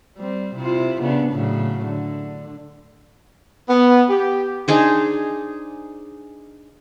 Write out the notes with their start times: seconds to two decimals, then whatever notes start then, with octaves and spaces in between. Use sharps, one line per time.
0.17 G3 C4
0.57 C3 E4 F4
1.02 C#3 B3 D4
1.32 A2 C#3 F#3
1.85 D3
3.69 B3
4.10 G4
4.68 D4 D#4 G#4 C5